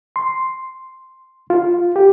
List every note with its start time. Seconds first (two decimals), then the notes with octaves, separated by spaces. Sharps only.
0.16 C6
1.50 F4
1.96 G4